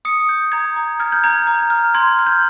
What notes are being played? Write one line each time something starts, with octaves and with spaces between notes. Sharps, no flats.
D#6 C#7
G6
A#5 G#6
A#5
F6 G#6
G6
A#5 G#6
A#5
F6
C6 G#6
F6
G6